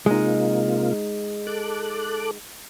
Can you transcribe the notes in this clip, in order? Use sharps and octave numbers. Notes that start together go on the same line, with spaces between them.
C3 G#3 A#3 D#4 F4
A4 D6 F#6